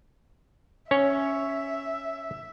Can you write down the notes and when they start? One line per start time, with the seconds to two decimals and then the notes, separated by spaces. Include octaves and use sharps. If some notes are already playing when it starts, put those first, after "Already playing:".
0.91 C#4 C#5 E5